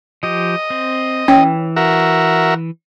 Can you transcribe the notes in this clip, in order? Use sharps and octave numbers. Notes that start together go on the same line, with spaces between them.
F3 G4 D#5
C4
E3 C#4 G5
F#4 A#4 E5